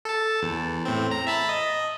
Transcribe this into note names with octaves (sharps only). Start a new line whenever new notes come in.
A4 A5
E2
A2 C4
A#5
E5 A5 B5
D#5